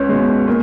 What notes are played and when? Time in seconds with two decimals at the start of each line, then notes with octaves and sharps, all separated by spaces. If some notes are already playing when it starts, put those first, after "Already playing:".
Already playing: C#2 C#4
0.09 B2 G#3
0.48 A#2